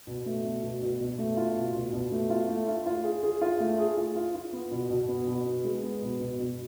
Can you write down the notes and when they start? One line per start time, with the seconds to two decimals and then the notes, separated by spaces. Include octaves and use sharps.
0.07 B2
0.26 A3
0.44 B2
0.63 B2
0.82 B2
1.00 B2
1.18 A3
1.37 F4
1.56 B2
1.74 B2
1.93 B2
2.12 A3
2.30 F4
2.49 A3
2.67 F4
2.86 F4
3.04 G#4
3.23 G#4
3.41 F4
3.60 A3
3.79 G#4
3.97 F4
4.16 F4
4.35 F4
4.53 B3
4.71 B2
4.90 B2
5.09 B3
5.27 B2
5.46 B3
5.65 G#3
5.83 B3
6.02 B2
6.20 B2
6.39 B2